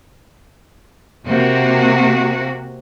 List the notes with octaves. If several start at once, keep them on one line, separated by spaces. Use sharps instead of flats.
C3 A#3 F#4